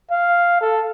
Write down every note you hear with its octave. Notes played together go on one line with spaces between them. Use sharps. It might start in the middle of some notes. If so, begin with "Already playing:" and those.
F5
A4